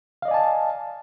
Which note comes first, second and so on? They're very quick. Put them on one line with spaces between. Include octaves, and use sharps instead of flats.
F5 D#5 D5 G#5 A5